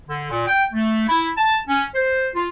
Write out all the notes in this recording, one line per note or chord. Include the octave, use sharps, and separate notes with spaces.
D3
A#2
G5
A3
E4
A5
C#4
C5
F4